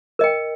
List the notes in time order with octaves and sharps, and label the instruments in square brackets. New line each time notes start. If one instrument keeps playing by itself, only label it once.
[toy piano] A#4 D#5 G5